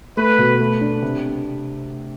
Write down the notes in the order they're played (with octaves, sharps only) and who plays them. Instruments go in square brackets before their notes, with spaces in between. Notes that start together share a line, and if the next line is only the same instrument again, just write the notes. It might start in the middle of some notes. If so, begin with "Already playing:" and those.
[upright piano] A3 [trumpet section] B4
[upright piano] B2
A3
D4
C3